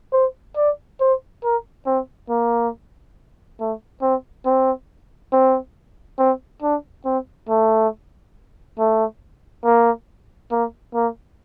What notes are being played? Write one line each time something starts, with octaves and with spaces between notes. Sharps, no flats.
C5
D5
C5
A#4
C4
A#3
A3
C4
C4
C4
C4
D4
C4
A3
A3
A#3
A#3
A#3